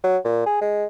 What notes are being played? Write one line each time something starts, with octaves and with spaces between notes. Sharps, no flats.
F#3
A#2
G#4
G#3